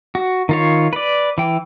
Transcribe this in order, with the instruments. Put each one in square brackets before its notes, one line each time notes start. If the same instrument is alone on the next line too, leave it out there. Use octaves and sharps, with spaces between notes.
[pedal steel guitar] F#4
D#3 F4 C#5
B4 D5
E3 G5